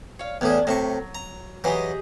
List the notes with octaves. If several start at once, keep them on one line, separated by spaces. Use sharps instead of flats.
C#5 F5
E2 A2 C#4 D4 G#4
A2 C3 F#3 C#6
A#5
E3 F#3 G4 G#4 D#5